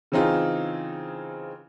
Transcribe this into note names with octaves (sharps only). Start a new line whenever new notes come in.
C#3 E3 C4 D#4 F4 G#4